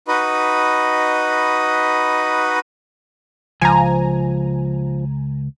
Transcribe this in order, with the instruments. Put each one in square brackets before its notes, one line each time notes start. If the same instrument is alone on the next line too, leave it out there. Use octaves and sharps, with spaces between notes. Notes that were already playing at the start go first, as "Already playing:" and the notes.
[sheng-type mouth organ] D#4 F#4 B4 D#5 B5
[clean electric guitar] C#2 [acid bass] F3 [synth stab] G#5 A#5